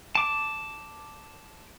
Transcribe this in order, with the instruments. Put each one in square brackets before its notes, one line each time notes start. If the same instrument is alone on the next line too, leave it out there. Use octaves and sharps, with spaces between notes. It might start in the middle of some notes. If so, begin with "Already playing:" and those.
[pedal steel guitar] A5 D6